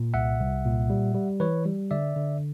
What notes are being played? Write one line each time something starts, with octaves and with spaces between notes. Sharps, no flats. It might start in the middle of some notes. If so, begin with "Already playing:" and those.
Already playing: A#2
C2 E5 F#5
C2
A#2
G3
G3
E3 B4 C#5
G3
D3 D5 E5
D3